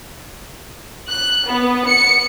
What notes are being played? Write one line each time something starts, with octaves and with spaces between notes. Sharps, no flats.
F#6
B3
C#7